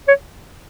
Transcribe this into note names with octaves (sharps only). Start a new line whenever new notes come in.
C#5